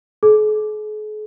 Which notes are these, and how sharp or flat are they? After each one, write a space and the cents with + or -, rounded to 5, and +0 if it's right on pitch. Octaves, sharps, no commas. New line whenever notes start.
G#4 +45